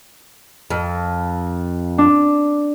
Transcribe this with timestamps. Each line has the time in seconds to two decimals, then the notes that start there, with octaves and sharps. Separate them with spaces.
0.70 F2
1.98 D4